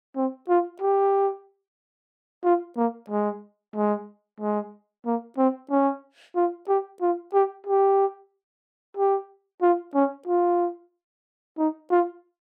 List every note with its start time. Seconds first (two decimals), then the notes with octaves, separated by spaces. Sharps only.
0.16 C4
0.49 F4
0.81 G4
2.44 F4
2.77 A#3
3.10 G#3
3.75 G#3
4.40 G#3
5.06 A#3
5.38 C4
5.70 C#4
6.36 F4
6.68 G4
7.01 F4
7.34 G4
7.67 G4
8.97 G4
9.62 F4
9.95 C#4
10.28 F4
11.58 D#4
11.91 F4